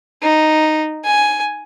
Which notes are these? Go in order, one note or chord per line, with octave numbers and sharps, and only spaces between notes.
D#4
G#5